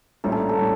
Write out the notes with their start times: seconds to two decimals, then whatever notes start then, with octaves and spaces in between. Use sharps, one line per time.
0.24 A#1 A2 G3 C#4 A#4
0.32 A4
0.49 A4
0.57 A2 G3 C#4